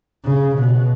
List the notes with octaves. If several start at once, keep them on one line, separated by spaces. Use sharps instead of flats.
C#3
B2